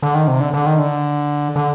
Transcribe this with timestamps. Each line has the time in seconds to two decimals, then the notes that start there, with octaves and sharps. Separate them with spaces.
0.02 D3
0.15 D#3
0.28 C3
0.40 D3
0.54 D3
0.66 D#3
0.79 D3
1.56 D3